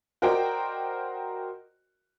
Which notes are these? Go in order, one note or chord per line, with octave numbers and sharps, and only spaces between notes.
F#4 A#4 C5 D5 D#5 G5